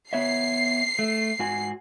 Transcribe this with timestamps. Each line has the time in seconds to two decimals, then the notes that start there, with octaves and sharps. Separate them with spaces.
0.13 B3 C#5 E5 C7
0.99 A3
1.39 G#2 F#4 G#5